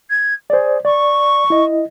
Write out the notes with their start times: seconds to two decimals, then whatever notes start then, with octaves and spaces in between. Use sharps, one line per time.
0.10 G#6
0.50 G#4 C5 D5
0.85 D5 C#6
1.50 E4 D#5